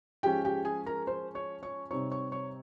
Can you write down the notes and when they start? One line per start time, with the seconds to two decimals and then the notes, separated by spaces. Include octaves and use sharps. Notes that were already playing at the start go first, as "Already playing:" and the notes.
0.23 F3 G#3 C#4 G4 G5
0.45 G4 G5
0.65 G#4 G#5
0.86 A#4 A#5
1.07 C5 C6
1.35 C#5 C#6
1.63 C#5 C#6
1.90 C3 G3 C4 D#4 C#5 C#6
2.11 C#5 C#6
2.32 C#5 C#6